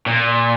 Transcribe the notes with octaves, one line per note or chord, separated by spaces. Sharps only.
A#2